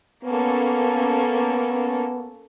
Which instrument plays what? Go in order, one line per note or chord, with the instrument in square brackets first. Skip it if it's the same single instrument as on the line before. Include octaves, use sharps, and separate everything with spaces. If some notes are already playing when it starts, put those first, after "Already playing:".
[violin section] A#3 C#4 A4 [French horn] B3